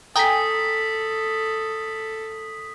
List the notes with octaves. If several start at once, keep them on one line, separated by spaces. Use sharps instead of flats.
A4 G5 G#5 A#5 D#6 B6